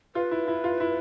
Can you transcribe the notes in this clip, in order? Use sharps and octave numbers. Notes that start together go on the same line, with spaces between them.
F4 B4
E4
E4
F4
E4